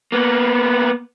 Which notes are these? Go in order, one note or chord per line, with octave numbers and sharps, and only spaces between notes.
A#3 B3